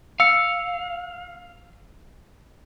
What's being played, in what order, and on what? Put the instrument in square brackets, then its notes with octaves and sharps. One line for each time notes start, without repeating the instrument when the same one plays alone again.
[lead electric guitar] F5 [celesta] E6 C#7